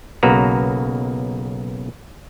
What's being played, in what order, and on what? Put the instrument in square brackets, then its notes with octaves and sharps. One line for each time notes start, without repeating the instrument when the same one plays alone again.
[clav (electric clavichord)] B1 C#3 A#3 F#4 B4 A#5